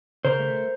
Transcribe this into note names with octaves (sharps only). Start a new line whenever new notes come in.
C#3 A#4 C5
A3